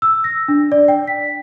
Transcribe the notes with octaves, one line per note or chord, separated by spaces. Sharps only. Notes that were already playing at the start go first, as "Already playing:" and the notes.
E6
A#6
D4
D5
G5
B6